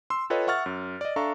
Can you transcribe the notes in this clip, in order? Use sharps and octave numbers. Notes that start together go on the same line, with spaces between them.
C6 E6
F4 A4 B4 C#5 D#5 G5
E5 F#5 C#6 F6 A6
F#2
D5 D#5
D4 A4 E5 F5 A#5 C#6